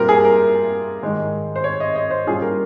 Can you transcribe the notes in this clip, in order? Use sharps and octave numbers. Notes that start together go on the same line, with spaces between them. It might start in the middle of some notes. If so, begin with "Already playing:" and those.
Already playing: A#2 G3 C4 F4 A#4
G#4
A#4
G#2 D#3 G#3 D#4
C5
C#5
D#5
D#5
C5
A#2 G3 C#4 F4 G#4
A#4